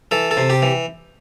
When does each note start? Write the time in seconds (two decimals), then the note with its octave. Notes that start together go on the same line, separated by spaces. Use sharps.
0.11 E3 A4
0.31 A4
0.37 C3
0.50 G4
0.62 E3